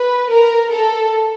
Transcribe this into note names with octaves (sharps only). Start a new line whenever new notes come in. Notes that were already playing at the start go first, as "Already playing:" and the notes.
Already playing: B4
A#4
A4